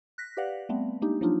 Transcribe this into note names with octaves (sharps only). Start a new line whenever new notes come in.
F#6 A#6 B6
G4 B4 D5 F5 F#5
G3 A3 B3 C4
G#3 A#3 D4 D#4 G4
F3 F#3 A#3 D4 D#4 F4